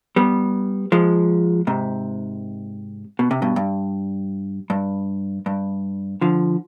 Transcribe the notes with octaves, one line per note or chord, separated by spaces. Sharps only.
G3 B3
F3 G#3
G#2 C3
B2
C3
G2 B2
G2
G2
G2
D3 F3